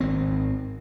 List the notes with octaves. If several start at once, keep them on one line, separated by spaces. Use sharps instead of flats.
G#1 D#3 C4